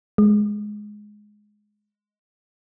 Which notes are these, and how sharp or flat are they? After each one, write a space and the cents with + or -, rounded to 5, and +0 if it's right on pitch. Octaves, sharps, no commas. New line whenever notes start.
G#3 +5